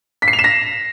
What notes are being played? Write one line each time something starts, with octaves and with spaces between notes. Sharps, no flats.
B6
C7
F7
E7
A#6